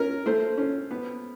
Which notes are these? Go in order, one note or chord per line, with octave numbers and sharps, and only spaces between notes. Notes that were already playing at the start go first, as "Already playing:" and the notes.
Already playing: C#4 A#4
A3 C5
C#4
B3